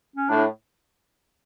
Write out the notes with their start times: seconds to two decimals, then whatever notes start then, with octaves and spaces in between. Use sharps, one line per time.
0.16 C#4
0.29 A2 D4